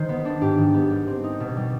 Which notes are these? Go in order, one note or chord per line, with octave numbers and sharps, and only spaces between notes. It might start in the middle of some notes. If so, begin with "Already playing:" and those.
Already playing: D#3 G#3 C5
B3
D4
G#2 G4
D#3
B3
G3
C4
D#4
B2
G3